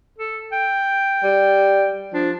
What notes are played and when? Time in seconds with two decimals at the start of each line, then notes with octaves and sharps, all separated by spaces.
0.18 A4
0.52 G5
1.23 G3
2.14 F3 D4